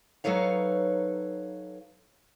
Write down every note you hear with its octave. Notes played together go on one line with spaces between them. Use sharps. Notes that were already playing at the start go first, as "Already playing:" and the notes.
F#3 D#4 A4 B4 C#5 F5